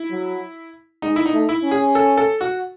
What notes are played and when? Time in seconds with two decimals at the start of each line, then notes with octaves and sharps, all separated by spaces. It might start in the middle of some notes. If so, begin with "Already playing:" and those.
Already playing: E4
0.10 F#3
1.02 G#3 D#4
1.16 E4
1.26 D#4
1.34 A3
1.49 E4
1.63 C#4
1.71 G#4
1.95 A4
2.18 A4
2.41 F#4